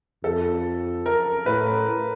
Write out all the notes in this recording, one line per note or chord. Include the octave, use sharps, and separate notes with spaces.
F2 A4
A#4
A2 B4